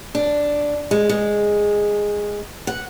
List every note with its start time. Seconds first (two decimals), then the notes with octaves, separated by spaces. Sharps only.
0.15 D4
0.91 G#3
1.09 G#3
2.67 F#5